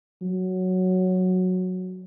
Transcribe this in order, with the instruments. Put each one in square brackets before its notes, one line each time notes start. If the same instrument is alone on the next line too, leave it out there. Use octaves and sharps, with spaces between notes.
[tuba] F#3